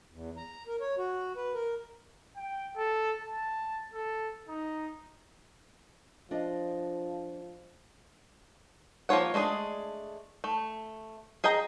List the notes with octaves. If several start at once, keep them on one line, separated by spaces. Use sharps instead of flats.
E2
A#5
A#4
C#5
F#4
B4
A#4
G5
A4
A5
A4
D#4
F3 D4 F4 D#5
F3 A#3 F4 C#5 F#5
G#3 A3 D4 G#4
A3
G#4 D#5 G5 A#5